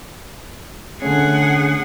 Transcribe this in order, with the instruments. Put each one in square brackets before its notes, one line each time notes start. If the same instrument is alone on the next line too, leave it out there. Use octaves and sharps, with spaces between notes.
[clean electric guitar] D3 A3 C#4 [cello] G#4 F#5